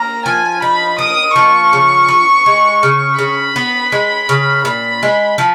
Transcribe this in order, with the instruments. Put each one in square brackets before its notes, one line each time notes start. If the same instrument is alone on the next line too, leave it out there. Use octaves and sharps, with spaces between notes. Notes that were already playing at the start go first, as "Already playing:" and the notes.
Already playing: [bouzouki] A#3 [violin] A#5
[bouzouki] F3 [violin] G#5
[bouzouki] D#4 [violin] B5
[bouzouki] A#3 [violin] D#6
[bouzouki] F3 [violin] C#6
[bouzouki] C#3
B3
G#3
C#3
[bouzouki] C#3 [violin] B5
[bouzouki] B3
G#3
C#3
[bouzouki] A#2 [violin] B5
[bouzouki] G#3
F3